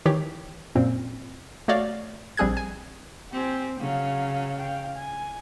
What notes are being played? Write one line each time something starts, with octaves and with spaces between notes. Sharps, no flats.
D#3 E3 G4 C#5
F#2 A#2 C4
A3 F#4 C#5 D5 F5
A#1 G3 C4 G#4 F#6 G#6
G#5
C4 G4 G#5
C#3 F#3 F5
F5 G5
G#5